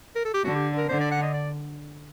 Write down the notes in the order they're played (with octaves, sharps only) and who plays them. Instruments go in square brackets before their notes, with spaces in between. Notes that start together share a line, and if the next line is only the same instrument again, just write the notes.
[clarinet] A#4
A4
G4
[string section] D3 [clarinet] F#4
[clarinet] G4
A#4
[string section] D3 [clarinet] C5
[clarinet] D5
F#5
D#5
D5